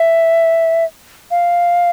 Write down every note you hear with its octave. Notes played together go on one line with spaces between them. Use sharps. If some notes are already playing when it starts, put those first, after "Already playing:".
Already playing: E5
F5